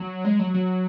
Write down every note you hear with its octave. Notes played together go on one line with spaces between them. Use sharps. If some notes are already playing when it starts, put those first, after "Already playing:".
Already playing: F#3
G#3
F#3
F#3